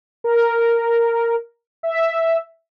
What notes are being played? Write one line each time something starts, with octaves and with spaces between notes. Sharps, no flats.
A#4
E5